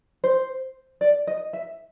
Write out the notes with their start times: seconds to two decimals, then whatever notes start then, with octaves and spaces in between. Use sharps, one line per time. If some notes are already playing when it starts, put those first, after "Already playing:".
0.24 C5
1.01 D5
1.27 D#5
1.53 E5